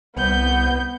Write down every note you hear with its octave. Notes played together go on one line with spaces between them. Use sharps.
C2 B3 G6